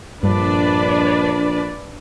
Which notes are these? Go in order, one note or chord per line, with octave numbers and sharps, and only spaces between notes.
A#1 G2 D4 B4 D5